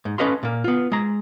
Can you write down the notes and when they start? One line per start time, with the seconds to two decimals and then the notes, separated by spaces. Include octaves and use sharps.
0.05 G#2
0.18 C#4 A4 B4 D#5 F5 C6
0.43 A#2 A#3
0.64 B3 F4
0.92 G#3 A#5